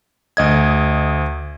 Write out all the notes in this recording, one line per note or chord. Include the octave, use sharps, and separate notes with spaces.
D2 D#5 G#6